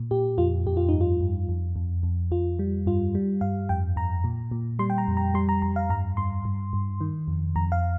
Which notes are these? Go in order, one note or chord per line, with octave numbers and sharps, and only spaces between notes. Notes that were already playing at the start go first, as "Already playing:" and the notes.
Already playing: A#2
A#2 G4
F2 F4
F2 G4
F4
D#4
G2
F4
G2
F2
F2
F2
F2 F4
G3
G2 F4
G3
G2 F5
F2 G5
F2 A#5
A#2
A#2
G3 C6
G5
A#5
F2
A#5
G3 C6
A#5
F2 A#5
F5
G2 A#5
G2 C6
G2
G2
D#3
F2
F2 A#5
F5